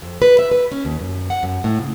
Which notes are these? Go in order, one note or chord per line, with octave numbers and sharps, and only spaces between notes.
F2
B4
E5
B4
C#4
D#2
F#2
F#5
F#2
A2
C#3